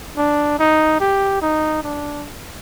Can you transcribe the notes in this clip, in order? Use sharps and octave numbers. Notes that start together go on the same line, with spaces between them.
D4
D#4
G4
D#4
D4